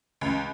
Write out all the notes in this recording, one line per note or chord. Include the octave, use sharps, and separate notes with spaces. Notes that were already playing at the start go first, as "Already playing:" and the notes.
C#2